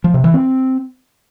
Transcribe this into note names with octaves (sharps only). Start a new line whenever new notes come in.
F3
C3
E3
C4